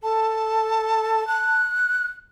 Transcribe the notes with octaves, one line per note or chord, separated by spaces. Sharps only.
A4 A5
F#6